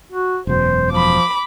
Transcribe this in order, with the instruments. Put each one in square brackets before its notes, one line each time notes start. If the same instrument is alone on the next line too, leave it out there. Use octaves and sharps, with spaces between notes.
[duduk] F#4
[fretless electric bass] E1 F#2 B2 [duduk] C5
[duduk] F3 [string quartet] B5 D6